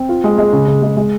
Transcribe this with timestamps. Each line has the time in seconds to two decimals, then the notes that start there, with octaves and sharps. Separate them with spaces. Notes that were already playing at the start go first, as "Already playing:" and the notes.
Already playing: C4
0.09 F4
0.24 G#3
0.38 G#3
0.53 C#3
0.67 C#3
0.82 G#3
0.96 G#3